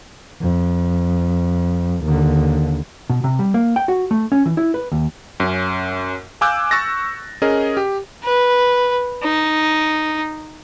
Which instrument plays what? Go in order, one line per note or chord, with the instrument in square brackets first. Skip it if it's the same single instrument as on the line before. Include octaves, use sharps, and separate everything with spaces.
[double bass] F2
D#2 D3
[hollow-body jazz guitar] B2
C3
G3
A#3
G5
F#4
A3
C#4
E3
E4
B4
D#2
[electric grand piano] F#2 C#4
F5 G#5 D6 E6 F#6 G6
C#6 E6 F#6 A6 A#6
C#4 G#4 A#4 D#5
G4
[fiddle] B4
D#4